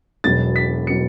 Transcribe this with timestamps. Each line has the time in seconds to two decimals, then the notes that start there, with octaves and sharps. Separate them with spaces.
0.24 E1 E2 B2 F#3 A6
0.56 B6
0.87 B2 F#3 C#7